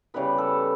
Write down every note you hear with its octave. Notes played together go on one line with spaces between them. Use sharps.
C#3 E3 G3 B3 B4
A4